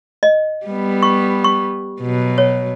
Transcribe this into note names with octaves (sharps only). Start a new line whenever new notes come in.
D#5
G3 B3
C#6
C#6
B2 F#3
C#5